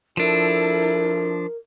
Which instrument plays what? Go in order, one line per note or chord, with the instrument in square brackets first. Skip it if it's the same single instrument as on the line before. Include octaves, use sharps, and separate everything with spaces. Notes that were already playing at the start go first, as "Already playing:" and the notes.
[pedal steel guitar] F3 D4 [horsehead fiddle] E4 A4 [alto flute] A#4